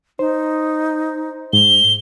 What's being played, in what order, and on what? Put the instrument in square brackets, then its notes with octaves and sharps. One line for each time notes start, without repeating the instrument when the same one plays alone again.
[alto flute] D#4 [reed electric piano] C5
[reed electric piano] G#2 [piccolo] G7